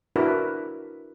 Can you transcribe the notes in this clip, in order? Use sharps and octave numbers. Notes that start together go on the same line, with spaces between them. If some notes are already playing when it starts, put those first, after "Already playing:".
D4 E4 F#4 A#4 B4